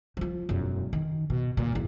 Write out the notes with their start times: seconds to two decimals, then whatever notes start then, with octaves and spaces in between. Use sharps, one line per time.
0.17 F3 F4
0.49 E1 F#2
0.93 D#3
1.30 B2
1.57 D#2 A#2
1.72 G#1 E2